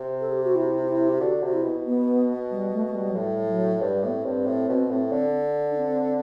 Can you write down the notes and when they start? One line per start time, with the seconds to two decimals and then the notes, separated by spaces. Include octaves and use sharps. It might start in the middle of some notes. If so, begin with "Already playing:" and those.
Already playing: C3
0.21 A4
0.32 G4
0.44 F#4
0.56 E4
0.88 E4
1.09 G4
1.21 D3 F#4
1.43 C3 F#4
1.53 E4
1.64 B2
1.86 B3
2.51 G3
2.73 A3
2.87 A3
2.95 G3
3.10 F#3
3.16 A2 G3
3.44 G3
3.49 F#3
3.81 G2 G3
4.03 A2 B3
4.14 C4
4.25 G2
4.46 A2
4.69 B2
4.90 A2
5.12 D3
5.71 D4
5.77 C4